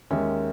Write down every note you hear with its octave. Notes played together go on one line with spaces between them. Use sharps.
D#2 D#3 G#3 C#4 E5